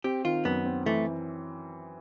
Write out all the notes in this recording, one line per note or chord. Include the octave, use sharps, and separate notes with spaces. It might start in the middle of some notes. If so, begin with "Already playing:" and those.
C4 G4
D#3 F4
F#2 B3
C4
E3 A3